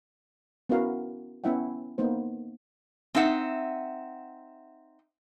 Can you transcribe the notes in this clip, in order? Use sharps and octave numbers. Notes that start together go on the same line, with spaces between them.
B3 C#4 E4 F#4 A#4 F5
B3 C#4 E4 E5 F#5 G5
A#3 B3 D#4 C5
C4 D#4 E5 F#5